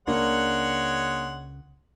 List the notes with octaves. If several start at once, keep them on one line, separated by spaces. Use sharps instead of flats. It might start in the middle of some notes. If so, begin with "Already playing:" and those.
C#2 C#3 G#3 A#3 D4 C#5 F#5